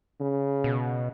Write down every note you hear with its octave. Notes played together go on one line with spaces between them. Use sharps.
C#3
B2